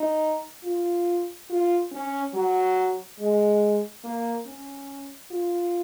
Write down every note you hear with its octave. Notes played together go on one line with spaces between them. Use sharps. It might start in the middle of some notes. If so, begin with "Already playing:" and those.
Already playing: D#4
F4
F4
C#4
F#3
G#3
A#3
C#4
F4